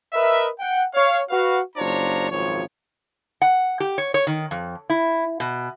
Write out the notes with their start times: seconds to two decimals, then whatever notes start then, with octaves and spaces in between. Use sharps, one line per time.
0.13 A#4 B4 D#5 E5
0.59 F#5 G5
0.94 C#5 F5
1.30 F#4 B4 F5
1.76 F#1 D4 F4 C5 C#5 A#5
2.30 G#1 C#2 F#2 F3 C#5
3.42 F#5
3.80 G4
3.98 C#5
4.14 C#5
4.27 D#3
4.51 F2
4.90 E4
5.40 B2